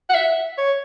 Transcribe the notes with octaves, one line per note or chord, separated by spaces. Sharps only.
F#5
E5
C#5